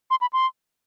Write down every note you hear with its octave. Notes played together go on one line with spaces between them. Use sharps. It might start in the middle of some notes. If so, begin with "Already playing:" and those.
C6
B5
C6